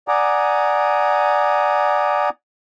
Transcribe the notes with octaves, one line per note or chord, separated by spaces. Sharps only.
D5 F#5 G#5 A#5 D6 D#6